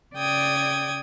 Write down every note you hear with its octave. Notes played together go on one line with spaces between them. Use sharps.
C#3 D5 G5 D#6 G#6